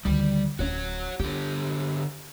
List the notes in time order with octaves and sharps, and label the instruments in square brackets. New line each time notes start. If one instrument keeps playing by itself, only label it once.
[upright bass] D2 D#3 [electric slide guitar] G3
[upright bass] D1 C#4 [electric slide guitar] F#4 C#5
[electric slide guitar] D3 G4 [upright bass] F4